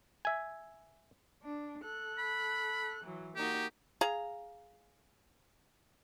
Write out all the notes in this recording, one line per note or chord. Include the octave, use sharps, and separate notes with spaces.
E5 G#5
D4
A4 F#6
B5
E3 F#3
A#3 D#4 F#4 G4
G#4 F5 A#5